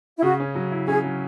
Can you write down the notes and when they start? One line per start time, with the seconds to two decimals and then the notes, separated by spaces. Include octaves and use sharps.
0.17 E4
0.22 C#3 F#4
0.40 C#4
0.55 F#3
0.72 E4
0.88 C#4 G#4
1.04 F#3